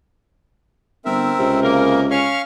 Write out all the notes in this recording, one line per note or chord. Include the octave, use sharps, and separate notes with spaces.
G1 C4 A#4 E5
C#2 C3
C#3 A#3 A#4
C#4 F5 C#6 F6